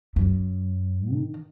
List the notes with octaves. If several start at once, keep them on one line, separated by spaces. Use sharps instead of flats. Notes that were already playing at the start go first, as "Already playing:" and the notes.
F#2
D#3